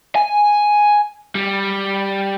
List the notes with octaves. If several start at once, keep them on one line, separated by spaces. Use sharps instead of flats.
G#5
G3